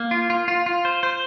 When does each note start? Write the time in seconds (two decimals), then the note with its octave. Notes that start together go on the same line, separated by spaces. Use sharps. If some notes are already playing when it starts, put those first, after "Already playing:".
Already playing: A#3
0.11 F4
0.30 F4
0.48 F4
0.66 F4
0.85 C5
1.03 C5